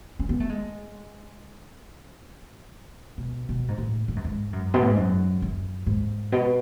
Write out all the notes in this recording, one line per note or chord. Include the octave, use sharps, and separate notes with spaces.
C#4
B3
A3
G#3
B2
B2
G#2
A2
G#2
F#2
G#2
F#2
B2
A2
G#2
F#2
F#2
G#2
B2